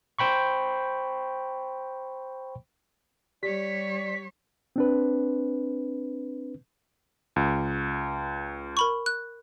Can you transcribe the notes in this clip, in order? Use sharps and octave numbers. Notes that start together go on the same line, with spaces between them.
C5 G5 B5 C#6
G3 G4 C#5 D5 B6
C4 D4 B4
C#2
A#4 B5 C#6
F#6